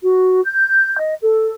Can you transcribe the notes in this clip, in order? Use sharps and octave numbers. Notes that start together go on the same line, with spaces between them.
F#4
G6
D#5
A4